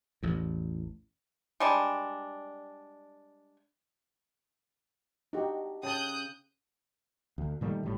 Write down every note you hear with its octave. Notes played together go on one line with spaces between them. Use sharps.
A1 E2
G3 G#3 D4
D4 D#4 F#4 G4
C#3 G5 A5 D#6 F#6 G6
D2
A#2 D#3 G3 A3
G1 A2 G3